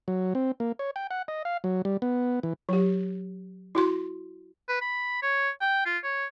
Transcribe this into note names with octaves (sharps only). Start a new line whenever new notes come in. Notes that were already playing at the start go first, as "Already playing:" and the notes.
F#3
C4
A#3
C#5
G5
F#5
D#5
F5
F#3
G3
B3
E3
F#3 G4
E4 F#4 C6
B4
B5
C#5
G5
F4
C#5